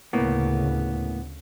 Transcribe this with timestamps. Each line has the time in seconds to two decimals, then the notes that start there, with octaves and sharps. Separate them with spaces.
0.13 D2 A2 C#3 A#3 B3